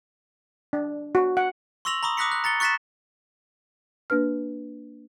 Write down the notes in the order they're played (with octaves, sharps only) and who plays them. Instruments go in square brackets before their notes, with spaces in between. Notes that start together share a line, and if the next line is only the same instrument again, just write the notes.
[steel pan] D4
F#4
F#5
[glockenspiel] C6 C#6 E6 A#6 F7 F#7
A#5 B5 C#6 D#6
D6 D#6 F#6 A#6 B6 C#7
F#6
A#5 A6 C#7 G7
C#6 F#6 A6 B6 C7 E7
[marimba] A#3 D4 B4 F6